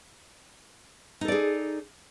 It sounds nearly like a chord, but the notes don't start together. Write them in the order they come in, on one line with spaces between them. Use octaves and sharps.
D#4 A4 D5 G#4